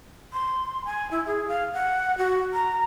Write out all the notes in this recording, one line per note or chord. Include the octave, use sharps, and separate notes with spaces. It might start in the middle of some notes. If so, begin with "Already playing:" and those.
C6
G#5
E4
G#4
F5
F#5
F#4
A#5